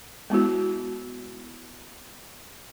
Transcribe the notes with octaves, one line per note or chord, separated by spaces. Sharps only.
G#3 B3 E4 F#4